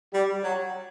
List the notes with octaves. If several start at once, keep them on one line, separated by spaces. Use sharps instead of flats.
G3
F#3